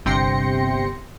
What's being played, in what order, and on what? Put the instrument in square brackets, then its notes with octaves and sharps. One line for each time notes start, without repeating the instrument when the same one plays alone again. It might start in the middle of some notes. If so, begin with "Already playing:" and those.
[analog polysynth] G1 C3 G5 C6 A#6 C#7